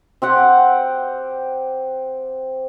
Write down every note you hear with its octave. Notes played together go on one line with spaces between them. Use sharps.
C4 G4 F#5